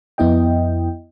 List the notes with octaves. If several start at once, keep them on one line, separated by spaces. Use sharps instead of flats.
F2 B3 E4 D#5 G5